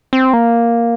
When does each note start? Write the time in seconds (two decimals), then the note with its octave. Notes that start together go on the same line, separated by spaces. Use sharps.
0.13 C4
0.33 A#3